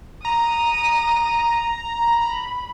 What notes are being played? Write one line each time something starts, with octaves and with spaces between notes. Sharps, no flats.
A#5 D#6
B5